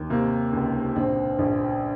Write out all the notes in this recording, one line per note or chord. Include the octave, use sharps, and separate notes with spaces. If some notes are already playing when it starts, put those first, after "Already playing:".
Already playing: D#2
C3 A#3
C#2
A#1 C4
A#1